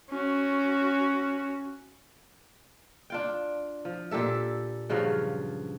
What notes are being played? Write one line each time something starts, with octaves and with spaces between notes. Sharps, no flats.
C#4 F#4
D4 F4 G5
F3
A#2 G4 A4 E5
G2 C#3 F3 F#3